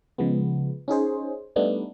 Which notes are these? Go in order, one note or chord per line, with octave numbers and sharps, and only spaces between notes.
C#3 F3 G#3 B3
C#4 D#4 G#4 C5
G3 A3 B3 D4 D#4